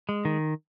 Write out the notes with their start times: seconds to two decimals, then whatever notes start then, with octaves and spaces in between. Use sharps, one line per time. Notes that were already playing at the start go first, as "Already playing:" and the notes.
0.09 G#3
0.25 D#3